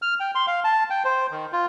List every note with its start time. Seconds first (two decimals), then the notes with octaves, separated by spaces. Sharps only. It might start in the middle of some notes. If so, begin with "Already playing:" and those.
0.02 F6
0.20 G5
0.35 C6
0.47 F5
0.64 A5
0.90 G5
1.05 C5
1.31 D#3
1.52 F4